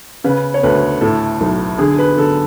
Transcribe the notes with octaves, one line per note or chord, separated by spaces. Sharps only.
C#3 B4
C#5
D2 B4
A2 A4
B1
D3 G#4
B4
D3 A4